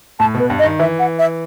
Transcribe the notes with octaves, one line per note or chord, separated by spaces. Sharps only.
A2 A5
B2 B4
G2
D#5
D#3
E3 E5
F#5
E5